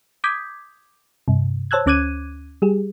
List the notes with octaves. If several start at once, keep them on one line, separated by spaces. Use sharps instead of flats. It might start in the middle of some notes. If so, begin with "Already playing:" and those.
D6 D#6 G6 G#6 B6
G2 C3
C5 C#5 A5 E6 F#6 G#6
D2 C#4 D6 F#6 G#6 D#7
G3 G4 G#4